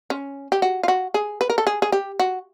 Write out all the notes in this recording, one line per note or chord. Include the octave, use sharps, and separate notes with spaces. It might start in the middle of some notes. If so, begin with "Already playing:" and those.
C#4
G4
F#4
F4
F#4
G#4
B4
A#4
A4
G#4
G#4
G4
F#4